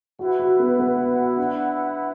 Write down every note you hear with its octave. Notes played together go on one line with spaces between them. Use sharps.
E4 F#4 B4 F#5
F#4
B3
B3
D4